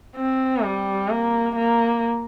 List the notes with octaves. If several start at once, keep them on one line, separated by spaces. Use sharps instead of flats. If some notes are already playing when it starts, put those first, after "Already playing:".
C4
G3
A#3
A#3